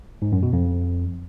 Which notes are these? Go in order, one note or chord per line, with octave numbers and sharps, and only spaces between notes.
G#2
F#2
B2
F2